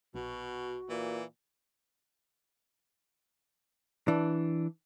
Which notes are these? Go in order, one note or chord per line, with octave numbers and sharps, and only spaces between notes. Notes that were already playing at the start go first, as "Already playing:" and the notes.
A#1 B2 F#4
A#2 E3
E3 D4